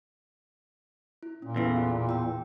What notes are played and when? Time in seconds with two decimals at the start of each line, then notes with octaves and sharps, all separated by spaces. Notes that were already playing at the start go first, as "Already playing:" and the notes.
1.23 E4
1.42 A#2 C#4
1.56 E2 B3 A4 F5
1.76 F4
2.09 G5 E6